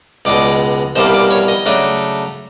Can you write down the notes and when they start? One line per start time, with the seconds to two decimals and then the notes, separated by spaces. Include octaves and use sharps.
0.25 C#2 B2 G#3 D5
0.96 C2 B2 G3 A#3 C5
1.14 D5
1.30 C#5
1.48 D#5
1.66 C#3 F#3 A3 D4